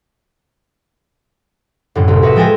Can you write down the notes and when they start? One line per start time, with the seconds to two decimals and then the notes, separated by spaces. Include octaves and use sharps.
1.95 F#2 A2 D3
2.08 C2
2.22 F#4 B4 D#5 E5
2.36 F3 G#3 A4 G5 G#5 A#6